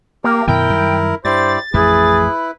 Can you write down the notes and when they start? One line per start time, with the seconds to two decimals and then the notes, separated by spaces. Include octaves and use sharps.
0.24 A#3 G4 A#4
0.48 F#2 B2 D#3 E4 A#4 G5
0.69 F#2 D#3 G3
1.25 G2 E4 G4 C5 D5 A6
1.74 A1 F2 A3 E4 G#4 B4